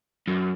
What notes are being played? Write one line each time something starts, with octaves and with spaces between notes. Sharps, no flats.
F#2